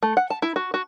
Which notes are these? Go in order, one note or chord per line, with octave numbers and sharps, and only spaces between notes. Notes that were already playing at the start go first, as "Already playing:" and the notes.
A3
F#5
A5
E4
F#4
F#4